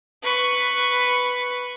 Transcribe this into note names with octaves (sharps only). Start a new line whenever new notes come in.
B4 C#6